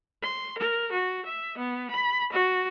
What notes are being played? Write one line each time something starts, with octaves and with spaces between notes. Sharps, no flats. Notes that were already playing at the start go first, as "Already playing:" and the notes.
C6
A#4
F#4
E5
B3
B5
F#4